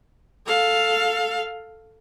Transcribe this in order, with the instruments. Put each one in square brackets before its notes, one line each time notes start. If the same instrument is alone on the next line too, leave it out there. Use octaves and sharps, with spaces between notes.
[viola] A4 F5